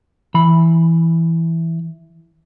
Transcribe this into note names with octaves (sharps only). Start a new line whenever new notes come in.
E3 B5